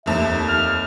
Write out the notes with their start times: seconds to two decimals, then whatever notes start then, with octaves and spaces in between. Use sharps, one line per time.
0.06 F1 D#2 E5
0.49 F6